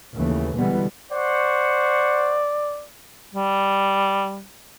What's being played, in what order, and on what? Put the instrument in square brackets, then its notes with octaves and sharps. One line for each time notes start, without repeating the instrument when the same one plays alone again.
[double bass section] D#2 C#3 E3 A3
B2 D3 E3 G3 G#3 B3
[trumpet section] C5 F#5 C#6 [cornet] D5
[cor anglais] G3